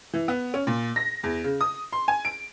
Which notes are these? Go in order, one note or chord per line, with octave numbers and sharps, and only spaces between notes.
E3
B3
C#4
A#2
A#6
E2
C#3
D#6
C6
G#5
D7